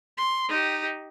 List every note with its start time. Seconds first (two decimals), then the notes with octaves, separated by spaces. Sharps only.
0.17 C6
0.49 D#4 G4